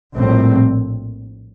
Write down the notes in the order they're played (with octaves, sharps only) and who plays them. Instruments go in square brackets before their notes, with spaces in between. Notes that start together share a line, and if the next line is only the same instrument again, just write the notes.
[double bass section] A#1 A2 G3 C4